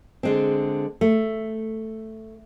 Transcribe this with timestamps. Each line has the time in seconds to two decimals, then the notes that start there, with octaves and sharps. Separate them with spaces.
0.23 D3 G#3 C4
1.01 A3